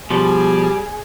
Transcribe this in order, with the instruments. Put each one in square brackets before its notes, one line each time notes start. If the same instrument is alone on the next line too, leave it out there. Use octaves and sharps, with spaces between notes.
[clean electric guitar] B2 F3 [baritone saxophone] G3 [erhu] G#4